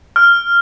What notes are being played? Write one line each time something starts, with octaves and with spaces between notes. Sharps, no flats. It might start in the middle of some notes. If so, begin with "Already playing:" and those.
F6